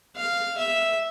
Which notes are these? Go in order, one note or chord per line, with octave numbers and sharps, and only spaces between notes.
F5
E5